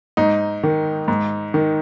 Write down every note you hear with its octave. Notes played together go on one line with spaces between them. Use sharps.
G#2 D#4
D#3
G#2
D#3